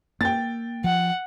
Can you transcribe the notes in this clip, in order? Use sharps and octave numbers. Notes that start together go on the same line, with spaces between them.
A#3 G5 A6
F3 F#5